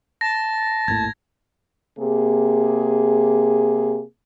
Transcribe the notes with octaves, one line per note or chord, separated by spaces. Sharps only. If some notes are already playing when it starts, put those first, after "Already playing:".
A5 A#6
G#1 D#2 A2 G#6
C3 A#3 G#4